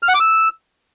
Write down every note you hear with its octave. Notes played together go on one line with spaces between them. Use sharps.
F6
F#5
D6
E6